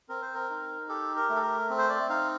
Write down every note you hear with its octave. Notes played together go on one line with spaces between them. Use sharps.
C4 A#4
C5
A#4
D#4
G4 A4
A#4
A3
A4
A#4
C4
C5
D5
D#4 F5